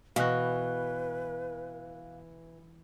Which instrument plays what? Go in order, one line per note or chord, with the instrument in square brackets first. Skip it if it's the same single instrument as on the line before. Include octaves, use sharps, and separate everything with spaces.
[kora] B2 F#4 [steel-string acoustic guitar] E3 [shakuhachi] B4 [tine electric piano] F5 F#6